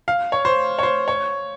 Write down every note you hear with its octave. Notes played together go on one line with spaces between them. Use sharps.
F5
C#5
C5
C#5
C5
C#5